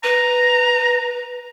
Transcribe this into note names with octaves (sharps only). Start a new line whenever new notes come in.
B4 A#5